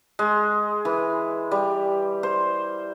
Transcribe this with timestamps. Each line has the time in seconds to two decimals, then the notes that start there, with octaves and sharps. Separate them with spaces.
0.19 G#3
0.85 E3
1.51 G3
2.23 C5